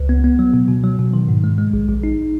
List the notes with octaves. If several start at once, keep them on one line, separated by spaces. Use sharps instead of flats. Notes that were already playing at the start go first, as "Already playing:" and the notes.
Already playing: C#2
B3
B3
F#3
B2
B2
F#3
B2
D#3
G#2
G#3
G#3
A#1
A#1
D#4